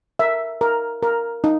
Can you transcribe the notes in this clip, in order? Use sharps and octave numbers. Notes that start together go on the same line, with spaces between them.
A#4 E5
A#4
A#4
D#4